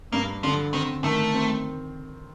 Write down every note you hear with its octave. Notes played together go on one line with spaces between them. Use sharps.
G2 A#3
D3 F3
D#3 C4
D#3 A3
C4